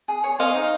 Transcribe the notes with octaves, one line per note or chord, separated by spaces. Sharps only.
G#4
C#5
C5 D#5 F5
D#4